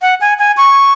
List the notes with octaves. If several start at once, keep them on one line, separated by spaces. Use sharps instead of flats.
F#5
G#5
G#5
C#6